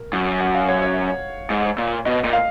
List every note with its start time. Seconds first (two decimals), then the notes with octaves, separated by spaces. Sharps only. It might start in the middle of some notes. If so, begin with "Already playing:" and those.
Already playing: A#4
0.13 F#2
0.40 F#5
0.55 F5
0.69 C#5
0.82 C#5
1.50 G#2
1.78 A#2
2.05 B2 D#5
2.24 A#2
2.33 F5